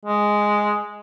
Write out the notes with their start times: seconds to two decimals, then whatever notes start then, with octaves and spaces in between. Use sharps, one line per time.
0.05 G#3